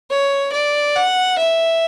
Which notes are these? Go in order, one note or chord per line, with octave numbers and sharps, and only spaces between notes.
C#5
D5
F#5
E5